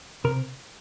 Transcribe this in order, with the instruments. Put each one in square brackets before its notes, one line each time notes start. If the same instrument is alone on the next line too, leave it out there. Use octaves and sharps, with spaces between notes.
[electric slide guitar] C3 A#4